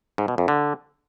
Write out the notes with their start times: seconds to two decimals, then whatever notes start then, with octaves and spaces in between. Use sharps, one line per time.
0.18 G#2
0.28 B2
0.38 F2
0.48 D3